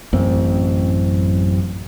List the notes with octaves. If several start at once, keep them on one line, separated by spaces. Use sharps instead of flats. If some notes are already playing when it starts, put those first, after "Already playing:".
A1 F#2 C4